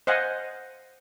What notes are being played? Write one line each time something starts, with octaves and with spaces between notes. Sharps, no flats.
C5 D#5 F5 F#5 G#5